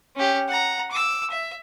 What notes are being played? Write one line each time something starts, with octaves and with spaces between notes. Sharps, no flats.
C#4 G4
F#5 A#5
D6 E6
E5